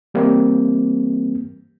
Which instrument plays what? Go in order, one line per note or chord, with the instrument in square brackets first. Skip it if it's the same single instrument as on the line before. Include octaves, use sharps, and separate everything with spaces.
[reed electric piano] E3 G3 A#3 C4